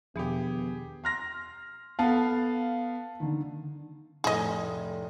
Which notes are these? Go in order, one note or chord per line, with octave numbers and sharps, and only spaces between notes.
E2 B2 D#3 F3 B3 G4 G#4
C6 F6 A#6
B3 A4 F5 A5
D3 D#3
F1 A2 G#4 D#5